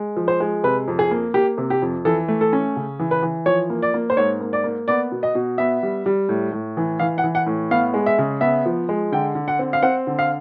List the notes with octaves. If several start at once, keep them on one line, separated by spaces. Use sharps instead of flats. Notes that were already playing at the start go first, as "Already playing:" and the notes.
Already playing: G#3
F3
C5
G#3
C3 B4
F2
G#4
A#3
A#3 G4
C3
G4
F2
E3 A4
A3
A4
C#4
C#3
E3
B4
E3
F3 C#5
A#3
D5
A#3
C5
G#2 C#5
A#3
D5
A#3
B3 D5
B2
D#5
B2
B3 E5
G3
G3
A2
A2
E3
E3 F5
F#5
E3
F#5
A2
B3 F5
G#3
E5
C#3
B3 E5
F3
G#3
D3 G5
D3
F#5
C4
F5
C4 F#5
D3
F5